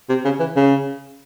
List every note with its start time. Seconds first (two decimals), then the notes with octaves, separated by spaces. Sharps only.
0.09 C3
0.25 C#3
0.40 E3
0.56 C#3